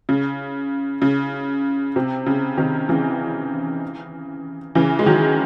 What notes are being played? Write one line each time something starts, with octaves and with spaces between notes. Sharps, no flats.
C#3
C#3
C3
C#3
C3 D#3
C#3 E3
C#3 E3
G#3
D#3 F#3